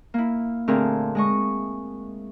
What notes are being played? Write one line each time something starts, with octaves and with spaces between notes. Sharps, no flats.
A#3 E4
A#2 D3 A3 C4 G#4 A#4
G#3 D#5 C#6